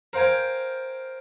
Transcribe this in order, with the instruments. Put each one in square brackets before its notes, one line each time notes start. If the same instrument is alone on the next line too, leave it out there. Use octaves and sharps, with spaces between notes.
[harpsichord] A#4 C5 F5 G5 G#5